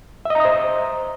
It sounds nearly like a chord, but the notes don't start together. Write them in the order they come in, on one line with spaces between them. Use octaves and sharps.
E5 D#5 A#5 D#6 C5